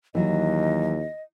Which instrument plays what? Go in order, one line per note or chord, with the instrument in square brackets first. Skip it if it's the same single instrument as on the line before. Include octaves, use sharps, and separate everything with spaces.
[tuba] D#2 [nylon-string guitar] E3 F#3 [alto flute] D#5